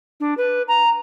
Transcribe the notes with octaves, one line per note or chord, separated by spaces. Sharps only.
D4
B4
A#5